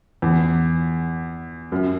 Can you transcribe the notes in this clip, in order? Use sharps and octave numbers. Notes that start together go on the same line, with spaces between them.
E2
F#2